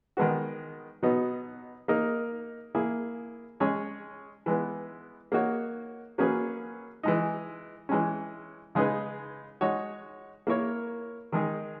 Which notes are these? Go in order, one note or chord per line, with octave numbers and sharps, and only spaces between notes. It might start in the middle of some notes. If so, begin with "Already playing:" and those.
D#3 G#3 B3 F#4
B2 F#3 B3 D#4
A#3 D#4 A#4
A#3 E4 G#4
G#3 C#4 G#4 C#5
E3 G#3 B3
A#3 D#4 F#4 C#5
F#3 A#3 C#4 G#4 B4
E3 G#3 D#4
E3 G#3 C#4
C#3 G#3 D#4 G#4 B4
G#3 D#4 F#4 C#5
A#3 E4 A#4 C#5
D#3 G#3 D#4 G#4